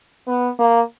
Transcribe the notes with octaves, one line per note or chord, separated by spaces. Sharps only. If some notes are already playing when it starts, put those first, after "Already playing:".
B3
A#3